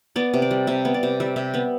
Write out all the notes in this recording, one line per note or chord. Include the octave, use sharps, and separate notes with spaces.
B3 D5
C3
D5
G3
C3 E5
B3
D5
C3
G3 E5
C3 E5
B3 E5